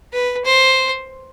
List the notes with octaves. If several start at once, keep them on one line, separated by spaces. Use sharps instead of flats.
B4
C5